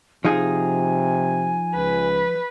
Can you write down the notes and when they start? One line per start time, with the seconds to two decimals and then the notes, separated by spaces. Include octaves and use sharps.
0.25 C3 F3 D#4 G#4 G#5
1.75 C#2 B4